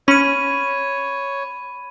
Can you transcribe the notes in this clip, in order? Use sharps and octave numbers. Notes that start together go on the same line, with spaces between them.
C#4 C#5 B5 D#7